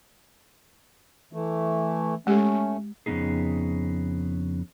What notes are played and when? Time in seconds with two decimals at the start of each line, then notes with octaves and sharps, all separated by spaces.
1.33 E3 A3
2.27 G#3 A3 C#4 G4
3.06 F2 C#3 F#3 B3 D#4 G#4